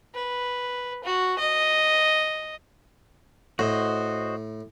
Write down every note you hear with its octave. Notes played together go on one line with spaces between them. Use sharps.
B4
F#4
D#5
A2 F#4 C5 D#5